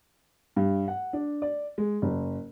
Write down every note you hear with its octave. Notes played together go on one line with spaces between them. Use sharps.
G2
F#5
D4
D5
G#3
F#1